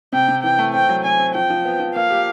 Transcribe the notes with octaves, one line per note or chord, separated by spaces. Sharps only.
C3 G5
C3
E3 G5
A3
C4 G5
F#3
C4 G#5
C4
F3 G5
F3
B3
F3
A#3 F5
G4